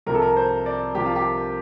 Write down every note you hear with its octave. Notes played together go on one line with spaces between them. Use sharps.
C2 C3 F3 A#4
A4
A#4
C5
D5
C2 C3 F3 G4
F4
G4